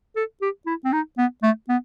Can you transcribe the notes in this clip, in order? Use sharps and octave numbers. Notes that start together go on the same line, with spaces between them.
A4
G4
E4
C4
D#4
B3
A3
B3